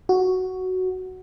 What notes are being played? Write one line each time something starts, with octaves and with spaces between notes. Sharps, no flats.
F#4